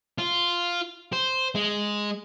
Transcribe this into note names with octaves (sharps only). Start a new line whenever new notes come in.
F4
C5
G#3